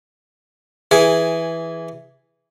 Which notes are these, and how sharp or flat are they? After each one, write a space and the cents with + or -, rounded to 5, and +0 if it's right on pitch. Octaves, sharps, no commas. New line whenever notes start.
E3 +0 G#4 +0